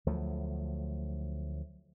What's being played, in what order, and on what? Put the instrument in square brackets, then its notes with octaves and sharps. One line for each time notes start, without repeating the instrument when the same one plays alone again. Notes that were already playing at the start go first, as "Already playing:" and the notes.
[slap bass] D2 F3 F#3 A3